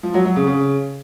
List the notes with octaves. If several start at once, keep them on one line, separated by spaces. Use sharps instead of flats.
F3
F#3
F#3
C#3
C#3